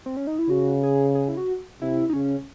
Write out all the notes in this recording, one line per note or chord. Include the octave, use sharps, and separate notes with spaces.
C4
C#4
D#4
E4
C#3 F#4
G#4
G#4
E4
F#4
C3 E4
D#4
C#3 C#4